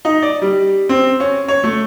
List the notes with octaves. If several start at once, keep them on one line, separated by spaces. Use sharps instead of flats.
D#4
D5
G3
C4
C#4
C#5
A3